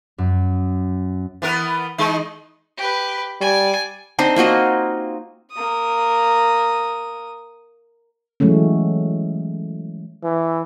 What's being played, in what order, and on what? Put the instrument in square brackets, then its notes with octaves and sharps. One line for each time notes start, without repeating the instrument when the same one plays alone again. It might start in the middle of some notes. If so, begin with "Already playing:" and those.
[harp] F#2
[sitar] E3 B3 A#4
E3 G#3 D#4
[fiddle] G4 B4
[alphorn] G3 [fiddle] D5 G#5
[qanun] C4 D4 D#4 C5
A#3 F4 F#4 D#5
[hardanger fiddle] A#3 D#6
[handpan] E3 F#3 G#3 A3 C#4
[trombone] E3